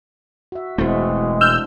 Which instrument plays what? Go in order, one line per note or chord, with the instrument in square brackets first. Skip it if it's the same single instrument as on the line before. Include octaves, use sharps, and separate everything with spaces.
[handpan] F#4 E5
[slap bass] E1 A3 [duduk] G#3 [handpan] C4 E4 F#4
[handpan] D4 [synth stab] E6 F6 G6